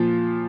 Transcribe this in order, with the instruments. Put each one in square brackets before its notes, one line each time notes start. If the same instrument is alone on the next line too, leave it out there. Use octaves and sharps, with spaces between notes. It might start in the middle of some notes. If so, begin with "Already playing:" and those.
Already playing: [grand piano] A#2 F3 F4